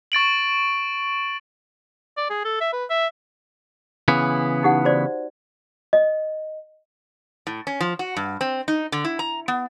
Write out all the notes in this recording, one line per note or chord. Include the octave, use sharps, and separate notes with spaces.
C#6 A6 D7 F#7
D5
G#4
A4
E5
B4
E5
C#3 E3 B3
D#4 G4 F#5
F#4 C5 D5
D#5
A2
C#4
F3
F#4
G2
C4
D#4
D3
E4
A#5
B3